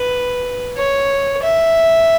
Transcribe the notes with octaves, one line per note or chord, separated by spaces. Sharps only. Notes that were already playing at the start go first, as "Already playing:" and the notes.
Already playing: B4
C#5
E5